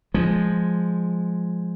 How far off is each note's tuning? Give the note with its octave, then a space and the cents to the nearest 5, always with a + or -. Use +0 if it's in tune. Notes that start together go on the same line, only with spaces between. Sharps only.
F3 +0 G#3 +0